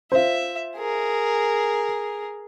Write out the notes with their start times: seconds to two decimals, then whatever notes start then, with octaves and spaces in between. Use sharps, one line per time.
0.12 F4 C5 E5
0.77 G#4 A#4